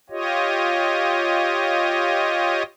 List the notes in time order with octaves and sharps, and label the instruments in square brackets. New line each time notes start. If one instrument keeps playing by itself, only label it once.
[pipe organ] F4 G4 C#5 D#5